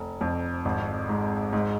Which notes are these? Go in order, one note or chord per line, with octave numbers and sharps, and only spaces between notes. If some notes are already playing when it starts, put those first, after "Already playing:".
Already playing: F1
F2
G#1
G#2
G#2